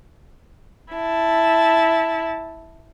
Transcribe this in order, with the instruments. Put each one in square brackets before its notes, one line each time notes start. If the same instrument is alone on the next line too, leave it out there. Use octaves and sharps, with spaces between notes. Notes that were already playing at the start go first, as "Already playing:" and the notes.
[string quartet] E4 A5